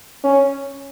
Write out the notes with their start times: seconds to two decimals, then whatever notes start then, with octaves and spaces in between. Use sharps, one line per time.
0.23 C#4